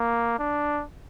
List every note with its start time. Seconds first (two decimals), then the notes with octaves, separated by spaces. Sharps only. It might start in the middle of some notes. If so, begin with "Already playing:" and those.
Already playing: A#3
0.39 D4